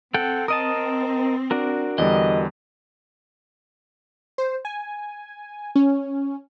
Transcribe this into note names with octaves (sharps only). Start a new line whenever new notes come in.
C4 A4 F#5 G5
A#4 D#5 A5 D#6
D4 F#4 A#4
E2 D3 G3 D#5
C5
G#5
C#4